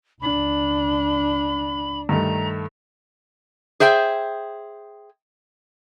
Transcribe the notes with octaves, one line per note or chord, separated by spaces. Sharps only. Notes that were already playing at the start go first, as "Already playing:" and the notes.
C#2 D4 B5
G2 D#3 A3 A#5
G#4 C5 E5 G5